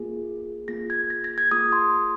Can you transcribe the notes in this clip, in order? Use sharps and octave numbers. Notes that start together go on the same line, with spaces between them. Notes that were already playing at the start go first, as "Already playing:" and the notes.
Already playing: A#3 F4 G#4
A#3 F4 G#4 A#6
G#6
A#6
A#6
G#6
A#3 F4 G#4 D#6
C6